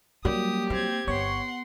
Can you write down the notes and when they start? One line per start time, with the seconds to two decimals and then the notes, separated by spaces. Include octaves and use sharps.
0.25 F#3 G3 A#3 C#4 G4 D#6
0.70 A#3 C4 G#6
1.07 G1 B3 C#5 F#5 C6 C#6